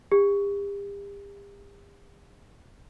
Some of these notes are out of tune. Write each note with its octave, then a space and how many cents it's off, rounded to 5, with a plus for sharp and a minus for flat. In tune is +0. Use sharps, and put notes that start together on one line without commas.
G4 +40